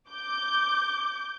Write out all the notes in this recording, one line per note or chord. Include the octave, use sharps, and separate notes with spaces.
D6 G6